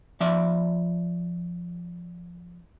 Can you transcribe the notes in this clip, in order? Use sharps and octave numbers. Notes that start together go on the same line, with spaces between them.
F3 D5 E5